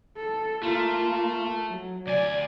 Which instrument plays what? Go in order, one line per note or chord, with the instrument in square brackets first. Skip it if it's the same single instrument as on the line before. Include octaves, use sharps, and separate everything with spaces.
[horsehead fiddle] A4
[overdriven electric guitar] A3 [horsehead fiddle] A#3 F4
[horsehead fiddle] F#3
[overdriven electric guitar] D2 G#5 [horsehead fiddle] D5